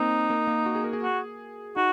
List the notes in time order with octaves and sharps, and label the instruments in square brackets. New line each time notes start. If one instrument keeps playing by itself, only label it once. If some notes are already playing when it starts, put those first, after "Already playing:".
Already playing: [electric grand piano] A#3 C4 [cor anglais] D#4
[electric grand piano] A#3
A#3
F#4
G#4
A#4
G#4
[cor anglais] F#4
[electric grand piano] D#4 [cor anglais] F#4